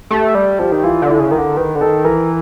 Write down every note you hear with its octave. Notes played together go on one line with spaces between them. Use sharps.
A3 G4
G3
F3 G4
D#3
E3 F4
D3
E4
C#3
D#3 A#4
D3
D#3 B4
D3
D#3 A4
E3 A#4